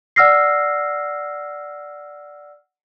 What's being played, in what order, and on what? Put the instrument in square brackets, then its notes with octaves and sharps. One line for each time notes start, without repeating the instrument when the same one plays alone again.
[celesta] D5 F#5 E6 F6 A#6 C7